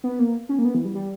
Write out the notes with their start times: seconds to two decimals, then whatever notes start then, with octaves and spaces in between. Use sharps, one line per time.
0.04 B3
0.19 A#3
0.49 C#4
0.59 A#3
0.65 B3
0.75 E3
0.85 G3
0.95 G3